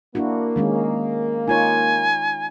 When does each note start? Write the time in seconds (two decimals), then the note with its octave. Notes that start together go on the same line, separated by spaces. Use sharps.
0.15 A#3 D4 E4 F#4
0.56 D#3 G#3 C#4
1.48 D#4 F4 C#5 G#5